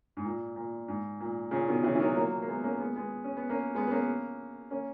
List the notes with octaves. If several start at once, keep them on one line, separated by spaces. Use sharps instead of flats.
G#2
A#2
A#2
G#2
A#2
A#2 C#3
B2 D#3
C#3 E3
E3
D#3 F#3
F#3 A#3
A#3
G#3 B3
A#3 C#4
G#3 B3
G#3 B3
C#4
B3
A#3 C#4
G#3 B3
B3
A#3 C#4
A#3 C#4